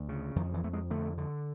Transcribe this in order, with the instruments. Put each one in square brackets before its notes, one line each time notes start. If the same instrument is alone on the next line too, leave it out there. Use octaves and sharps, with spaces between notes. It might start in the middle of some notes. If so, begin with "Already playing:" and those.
Already playing: [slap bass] D2
C#3
F2 D#3
E3
F2 A3
G#3
D3 A3
D3